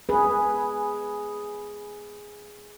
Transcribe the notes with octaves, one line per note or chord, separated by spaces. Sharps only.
G#4 B4